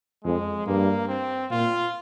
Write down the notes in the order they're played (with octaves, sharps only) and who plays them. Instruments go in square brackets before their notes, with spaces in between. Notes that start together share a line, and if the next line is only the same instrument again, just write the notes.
[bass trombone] F2 [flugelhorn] G#3
[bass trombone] G2 [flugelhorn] A#3
[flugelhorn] C4
[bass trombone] A#2 [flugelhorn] F4